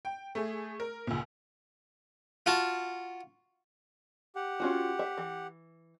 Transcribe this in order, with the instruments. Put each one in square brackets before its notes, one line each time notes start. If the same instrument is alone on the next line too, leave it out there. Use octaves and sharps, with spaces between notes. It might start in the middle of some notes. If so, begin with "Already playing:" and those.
[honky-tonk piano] G5
A3 G#4
A#4
C#2 A#2
[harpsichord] F4 F#4 A5
[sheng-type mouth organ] G4 F#5
[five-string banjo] C#4 F4 F#4
E5
E3